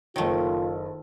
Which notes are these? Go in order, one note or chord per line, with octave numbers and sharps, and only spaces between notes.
F#1 D#3 A3 F4 C#5